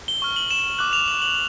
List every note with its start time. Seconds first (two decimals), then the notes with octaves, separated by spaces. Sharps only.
0.08 G7
0.21 C#6 F6 G7
0.36 F#7
0.51 E7
0.64 G7
0.79 D6 F#6 F#7
0.93 F7
1.08 F#7
1.22 F#7